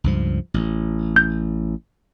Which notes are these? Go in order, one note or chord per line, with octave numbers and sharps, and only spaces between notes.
C#2 G2 F3
A1
G6